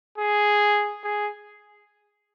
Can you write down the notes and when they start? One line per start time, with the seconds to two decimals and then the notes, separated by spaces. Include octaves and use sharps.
0.18 G#4
1.04 G#4